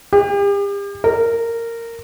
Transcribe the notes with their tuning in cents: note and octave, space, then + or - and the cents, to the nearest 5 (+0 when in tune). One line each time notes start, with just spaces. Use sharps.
G4 +40
A#4 -15